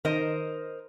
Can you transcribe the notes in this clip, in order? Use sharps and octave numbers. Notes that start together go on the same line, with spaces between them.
D#3 A#4 C5 D#5